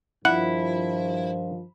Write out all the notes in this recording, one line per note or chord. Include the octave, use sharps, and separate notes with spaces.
G2 D#3 F3 E4 F#5